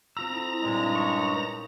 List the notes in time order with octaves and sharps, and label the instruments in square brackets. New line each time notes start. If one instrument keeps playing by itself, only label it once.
[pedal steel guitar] C4 F4 E6 [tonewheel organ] A#5
[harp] D#4 E4 A4
[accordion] G2 G#3 [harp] A#2 D#5
[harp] A#3 C#4 D#4 [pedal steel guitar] C#6